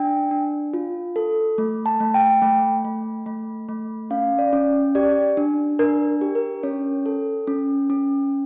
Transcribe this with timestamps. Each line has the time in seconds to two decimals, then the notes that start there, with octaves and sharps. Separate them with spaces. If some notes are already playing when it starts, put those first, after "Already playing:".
Already playing: D4 G5
0.31 D4
0.74 F4
1.16 A4
1.58 A3
1.86 A5
2.00 A3
2.14 G5
2.42 A3
2.85 A3
3.26 A3
3.69 A3
4.11 C#4 F5
4.39 D5
4.53 C#4
4.95 G4 D5
5.37 D4
5.79 D4 A#4
6.21 G4
6.35 A#4
6.63 C#4 C#5
7.06 A4
7.47 C#4
7.90 C#4